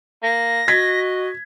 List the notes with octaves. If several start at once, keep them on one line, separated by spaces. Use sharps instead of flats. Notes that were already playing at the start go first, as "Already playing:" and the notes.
A#3 A#6
F#4 D#5 G#6 B6